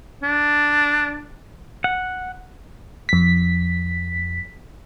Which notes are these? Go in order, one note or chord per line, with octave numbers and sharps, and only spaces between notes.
D4
F#5
F2 B6